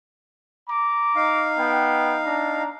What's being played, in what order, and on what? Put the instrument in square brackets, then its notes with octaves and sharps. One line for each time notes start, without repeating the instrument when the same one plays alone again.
[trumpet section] A#5 D6
[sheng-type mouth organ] D#4 F5
[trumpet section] B3 G5
D4 A#5